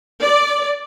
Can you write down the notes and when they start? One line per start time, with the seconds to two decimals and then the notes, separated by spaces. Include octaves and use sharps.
0.24 D5